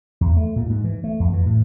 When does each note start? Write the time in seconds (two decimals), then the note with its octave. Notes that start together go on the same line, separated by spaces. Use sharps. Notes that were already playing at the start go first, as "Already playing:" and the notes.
0.21 E2
0.37 A3
0.56 A#2
0.70 G#2
0.84 E3
1.04 A3
1.20 F2
1.33 E3
1.46 A2